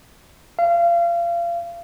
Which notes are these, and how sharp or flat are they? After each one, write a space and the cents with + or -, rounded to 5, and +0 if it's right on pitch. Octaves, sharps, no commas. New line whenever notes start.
F5 -30